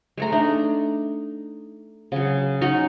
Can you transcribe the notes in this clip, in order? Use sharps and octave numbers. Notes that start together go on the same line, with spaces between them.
G#3 A3 A#5
A3 D4 D#4
C#3 F#3
C#4 D#4 F#4